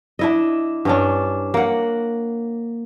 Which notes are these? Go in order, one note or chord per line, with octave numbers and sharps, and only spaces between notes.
D4 E4 D#5
G2 C#4 D4
A#3 F#5